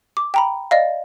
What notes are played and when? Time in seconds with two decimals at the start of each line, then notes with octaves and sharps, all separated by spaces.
0.17 D6
0.34 G5 A#5 B5
0.71 D5 D#5 F5